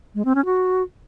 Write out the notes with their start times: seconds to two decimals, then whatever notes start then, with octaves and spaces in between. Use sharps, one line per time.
0.15 G#3
0.25 C4
0.35 C#4
0.45 F#4